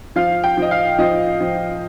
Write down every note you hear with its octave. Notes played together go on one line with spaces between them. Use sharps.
F3 F5
G5
F3 D#5
F5
F3 D#5
F3